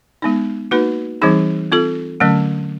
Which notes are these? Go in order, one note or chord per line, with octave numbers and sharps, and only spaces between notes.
G#3 B3 D#4
A#3 D#4 F#4 B4
E3 G3 C4 D#4 G#4
C4 F4 A4
D3 F#3 A3 C#4